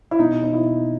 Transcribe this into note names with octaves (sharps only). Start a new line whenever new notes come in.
E4
B2 D#4
B2 D#4
E4
B2